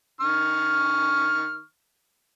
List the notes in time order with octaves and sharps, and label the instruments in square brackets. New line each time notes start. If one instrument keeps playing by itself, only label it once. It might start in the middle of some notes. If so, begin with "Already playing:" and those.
[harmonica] D#3 C#6 F6